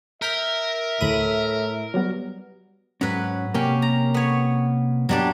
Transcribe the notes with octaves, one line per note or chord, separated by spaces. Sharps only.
A#4 E5 F6 G6 B6
D2 A2 B5 D#7
F#3 G3 B3
G#2 F#3 C#4 B4
C3 A#3 C#4 G4 A#4
A#5
B3 C#5
G2 F#3 G3 B3 D4